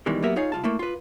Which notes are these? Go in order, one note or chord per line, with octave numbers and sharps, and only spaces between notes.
B2 D#3 E3 G3 G#3
F#3 A#3 B3 G4 A#4 E5
D#4 F4 G#4 C#5 F5
C2 F4 A5
A3 A#3 E4
F4 B4